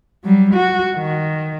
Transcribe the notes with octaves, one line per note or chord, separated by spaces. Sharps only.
F#3 G3
F#4
D#3